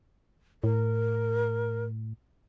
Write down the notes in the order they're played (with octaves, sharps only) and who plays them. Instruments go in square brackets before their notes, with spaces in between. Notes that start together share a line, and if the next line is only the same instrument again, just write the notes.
[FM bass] A2 [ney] A#4